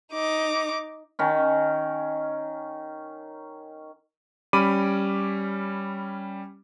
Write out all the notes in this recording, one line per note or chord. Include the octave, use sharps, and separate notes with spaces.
D#4 D6
D#3 C#4
G3 C#4 B5 D6 D#7